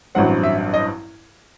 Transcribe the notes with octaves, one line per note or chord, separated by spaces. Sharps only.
A1 G2 F#3 C4 F#5
E5
D#5